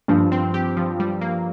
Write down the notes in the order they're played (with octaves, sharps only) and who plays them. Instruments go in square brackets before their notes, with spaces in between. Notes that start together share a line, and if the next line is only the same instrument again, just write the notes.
[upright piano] G2 [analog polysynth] F3
[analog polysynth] C4
G4
F3
G3
A#3